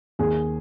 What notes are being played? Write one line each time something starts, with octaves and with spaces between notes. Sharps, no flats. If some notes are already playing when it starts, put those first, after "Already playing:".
D#2 G#4